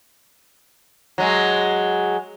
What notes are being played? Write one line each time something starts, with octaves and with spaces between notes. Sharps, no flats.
F#3 G#3